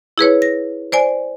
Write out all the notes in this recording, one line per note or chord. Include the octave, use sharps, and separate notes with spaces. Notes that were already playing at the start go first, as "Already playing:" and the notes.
E4 G#4 B4 C#5
A#6
C5 D5 G#5